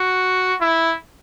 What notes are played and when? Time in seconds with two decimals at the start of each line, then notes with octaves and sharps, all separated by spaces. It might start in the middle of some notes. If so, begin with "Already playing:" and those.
Already playing: F#4
0.61 E4